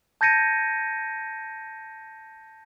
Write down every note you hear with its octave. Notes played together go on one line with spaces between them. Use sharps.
A5 G6 G#6 A#6 C#7 D#7